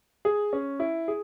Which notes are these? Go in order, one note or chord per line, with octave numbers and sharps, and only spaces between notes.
G#4
C#4
E4
G#4